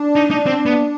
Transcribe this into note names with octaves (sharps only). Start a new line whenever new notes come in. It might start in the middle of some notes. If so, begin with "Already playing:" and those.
Already playing: D4
D#4
D#4
C4
B3